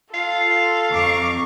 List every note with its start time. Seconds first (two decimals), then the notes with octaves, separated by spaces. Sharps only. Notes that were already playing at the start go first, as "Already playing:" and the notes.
0.14 F4 A4 F5
0.92 F2 A#5 C#6 D6